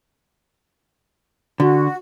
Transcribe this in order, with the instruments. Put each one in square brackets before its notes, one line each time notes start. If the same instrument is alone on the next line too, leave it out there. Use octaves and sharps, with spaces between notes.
[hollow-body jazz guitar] D3 [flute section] F#4